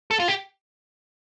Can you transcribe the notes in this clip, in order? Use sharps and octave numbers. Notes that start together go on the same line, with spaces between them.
A4
F4
G4